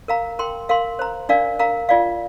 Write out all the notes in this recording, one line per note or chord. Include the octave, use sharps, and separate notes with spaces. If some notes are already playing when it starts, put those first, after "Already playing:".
A#4 F5 A#5
A#4 G5 C6
A#4 F5 C6
C5 A#5
D4 A#4 D5 F5
A#4 F5 A#5
F4 D5 F5